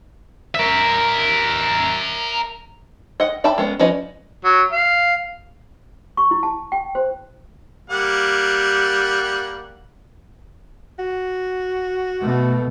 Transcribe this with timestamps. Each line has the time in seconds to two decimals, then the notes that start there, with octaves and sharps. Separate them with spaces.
0.55 A#4 E5
3.20 D#5 F#5
3.44 D5 E5 G5 A5 B5
3.58 G#3 B3 C#4
3.79 F3 C#4 B4 D5 D#5
4.44 F#3
4.72 F5
6.17 C#6
6.31 E4
6.43 A5
6.72 G5
6.95 C5
7.90 G3 A#3 F#5
10.99 F#4
12.21 B2 A3